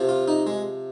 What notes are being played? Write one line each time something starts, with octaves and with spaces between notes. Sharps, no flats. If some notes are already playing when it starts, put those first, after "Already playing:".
Already playing: C3 F3
F4
D#4
G#3